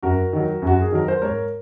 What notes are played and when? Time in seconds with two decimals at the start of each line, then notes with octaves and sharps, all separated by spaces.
0.03 F#2 F#4 A#4
0.33 D#3 F#3
0.62 F#2
0.67 F#4
0.81 G#4
0.92 D#3 F#3 A#4
1.08 C5
1.22 G#2 A#4 C#5